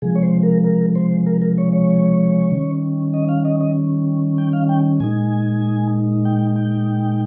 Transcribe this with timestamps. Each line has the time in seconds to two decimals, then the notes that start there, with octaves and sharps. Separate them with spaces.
0.02 C3 F3 G#3 G#4
0.15 C#5
0.23 C5
0.43 A#4
0.64 A#4
0.95 C5
1.26 A#4
1.42 A#4
1.58 C#5
1.73 C#5
2.51 D#3 G3 C#4
3.14 D#5
3.29 F5
3.45 D#5
3.61 D#5
4.38 G5
4.53 F5
4.69 G5
5.00 A#2 G#3 D#4 G#5
6.25 G5
6.56 G5